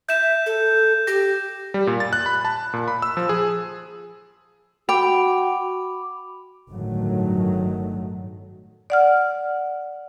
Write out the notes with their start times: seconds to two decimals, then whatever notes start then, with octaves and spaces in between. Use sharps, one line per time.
0.09 E5 G6 E7
0.46 A4
1.07 G4 A#6
1.74 G3
1.87 A#2
2.00 A6
2.13 F#6
2.26 B5
2.45 A5
2.73 A#2
2.88 B5
3.02 E6
3.17 F3
3.29 G#4
4.89 F#4 G5 B5 D6
6.69 G1 A2 D#3 F#3 A3
8.90 D5 F#5 F6